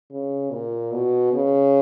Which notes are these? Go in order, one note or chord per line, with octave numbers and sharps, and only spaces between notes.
C#3
A#2
B2
C#3